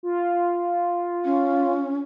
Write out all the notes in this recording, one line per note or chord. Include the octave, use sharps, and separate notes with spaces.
F4
C#4